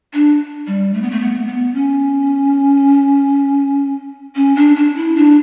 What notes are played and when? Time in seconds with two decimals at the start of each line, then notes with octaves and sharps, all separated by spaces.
0.13 D4
0.67 G3
0.94 A3
1.02 B3
1.11 A3
1.20 B3
1.48 B3
1.74 C#4
4.35 C#4
4.56 D4
4.76 D4
4.96 E4
5.16 D4